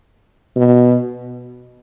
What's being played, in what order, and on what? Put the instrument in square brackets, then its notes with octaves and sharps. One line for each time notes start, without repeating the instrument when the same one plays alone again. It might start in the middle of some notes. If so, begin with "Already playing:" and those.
[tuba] B2